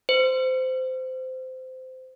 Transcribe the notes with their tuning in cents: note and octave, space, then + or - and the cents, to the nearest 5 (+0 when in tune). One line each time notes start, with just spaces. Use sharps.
C5 -20